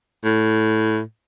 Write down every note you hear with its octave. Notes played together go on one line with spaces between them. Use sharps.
A2